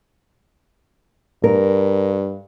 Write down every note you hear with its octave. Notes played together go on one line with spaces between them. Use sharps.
G2 A#4